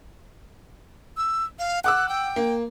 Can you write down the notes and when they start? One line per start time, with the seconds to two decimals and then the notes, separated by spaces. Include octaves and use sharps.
1.17 E6
1.59 F5
1.84 F#5 D6 E6 F#6
2.09 G5
2.36 A#3